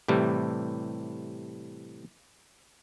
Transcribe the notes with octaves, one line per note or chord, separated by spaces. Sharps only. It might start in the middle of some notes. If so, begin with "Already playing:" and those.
A2 C3 E3 G3